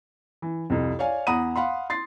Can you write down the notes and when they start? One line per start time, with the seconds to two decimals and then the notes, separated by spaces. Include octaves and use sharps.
0.42 E3
0.70 C2 F2
0.99 C#5 D5 F5 G#5
1.27 E2 F#5 A#5 B5 D#6 D#7
1.56 F5 F#5 B5 C6
1.90 C6 A6 C7